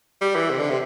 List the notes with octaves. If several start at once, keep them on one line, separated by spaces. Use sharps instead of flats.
G3
E3
C3
D3
C3